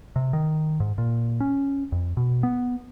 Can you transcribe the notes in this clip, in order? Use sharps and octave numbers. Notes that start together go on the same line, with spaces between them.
C3
D#3
G#2
A#2
C#4
F2
B2
B3